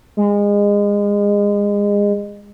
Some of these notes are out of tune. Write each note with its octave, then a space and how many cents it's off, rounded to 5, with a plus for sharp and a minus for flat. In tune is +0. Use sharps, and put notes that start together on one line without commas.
G#3 -25